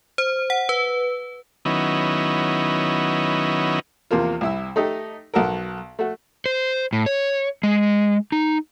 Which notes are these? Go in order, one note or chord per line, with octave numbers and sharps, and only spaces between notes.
C5
F#5
B4
D#3 F#3 B3 C#4 D#4 E4
E2 C3 F3 A#3 F4
C2 E4 E6
A3 D#4 G4 A4
B1 F#4 A4 A#4
A3 F#4
C5
A2
C#5
G#3
D#4